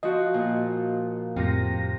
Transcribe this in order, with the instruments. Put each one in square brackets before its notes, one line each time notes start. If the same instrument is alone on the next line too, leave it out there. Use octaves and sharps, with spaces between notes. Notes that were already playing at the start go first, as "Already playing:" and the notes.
[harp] F3 F#4 [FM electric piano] D#5
[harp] A#2
[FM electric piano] F2 A2 A#6 [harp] C3 F4